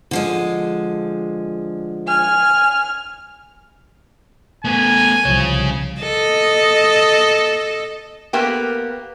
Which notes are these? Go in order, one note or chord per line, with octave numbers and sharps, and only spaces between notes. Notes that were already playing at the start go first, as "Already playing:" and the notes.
D3 F3 G#3
G#5 F6
A3 B3 G#5
C2 C#3 F3 C#5
A4 D#5
A#3 B3 G4